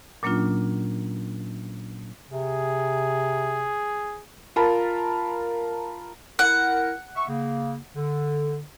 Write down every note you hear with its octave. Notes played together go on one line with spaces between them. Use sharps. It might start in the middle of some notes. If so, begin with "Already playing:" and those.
A#2 F#3 A#3 C#4 D4 F4
C3 G#4
F4 A#4 A5 B5
E4 A#4 F#5
E5 C#6
C#3 A#3
D3